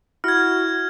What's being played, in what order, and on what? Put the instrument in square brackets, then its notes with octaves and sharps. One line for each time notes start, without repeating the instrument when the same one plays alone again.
[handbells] E4 [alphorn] F#4 [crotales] F6 G#6